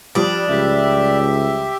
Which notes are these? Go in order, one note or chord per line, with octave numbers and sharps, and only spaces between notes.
F3 G3 D4 D#6
C#2 G4 E5